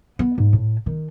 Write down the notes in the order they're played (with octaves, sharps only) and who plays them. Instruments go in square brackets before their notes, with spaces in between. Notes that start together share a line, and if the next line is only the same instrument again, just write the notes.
[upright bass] B3
G#2
A2
D#3